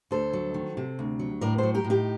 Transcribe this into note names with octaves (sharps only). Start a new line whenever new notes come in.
D2 A4 C5
F#3
D#3
C3
D2
F#3
A2 A#4 D5
F#3 A4 C5
G4 A#4
A2
D#4 G4